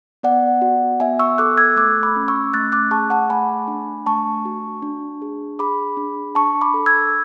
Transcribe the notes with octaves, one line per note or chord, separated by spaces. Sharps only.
B3 D5 F#5
F#4
B3 E5 G#5
C#6 E6
A4 D6 F#6
E6 G#6
A3 D6 F#6
B5 D6
C#4
C#6 E6
A3 F#6 A6
D6 F#6
G#4 A5 C#6
F#5 A5
A3 G#5 B5
D4
A3 A5 C#6
F#4
D4
G#4
G#4 B5 D6
D4
D4 A5 C#6
B5 D6
A4
E6 G#6